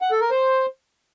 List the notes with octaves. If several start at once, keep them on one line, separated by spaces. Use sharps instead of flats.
F#5
A4
A#4
C5